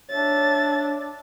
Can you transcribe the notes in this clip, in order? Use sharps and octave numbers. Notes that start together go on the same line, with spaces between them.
D4 C#5 E5 A6